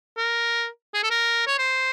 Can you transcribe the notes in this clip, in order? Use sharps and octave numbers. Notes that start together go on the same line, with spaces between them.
A#4
G#4
A4
A#4
C#5
C5